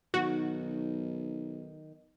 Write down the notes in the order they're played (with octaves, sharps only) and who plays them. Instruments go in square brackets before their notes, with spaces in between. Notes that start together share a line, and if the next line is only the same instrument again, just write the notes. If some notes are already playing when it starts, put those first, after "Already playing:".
[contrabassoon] B1 [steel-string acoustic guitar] D#3 [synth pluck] F#4